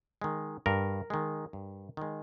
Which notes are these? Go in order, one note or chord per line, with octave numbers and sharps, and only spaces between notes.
D#3 G#3
G2 A#4
D#3 G#3
G2
D#3 G#3